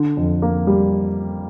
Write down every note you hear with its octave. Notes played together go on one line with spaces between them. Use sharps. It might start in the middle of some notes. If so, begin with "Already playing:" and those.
Already playing: D3
F2
A#3
G3